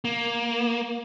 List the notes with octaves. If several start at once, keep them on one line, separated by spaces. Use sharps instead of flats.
A#3